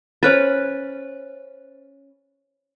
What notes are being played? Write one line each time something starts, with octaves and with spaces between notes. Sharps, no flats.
C#4 B4 C5 F#6 A6